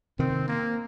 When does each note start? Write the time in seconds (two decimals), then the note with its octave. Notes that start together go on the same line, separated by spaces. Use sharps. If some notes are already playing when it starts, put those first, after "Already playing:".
0.19 C3 D#3 C4
0.48 A#3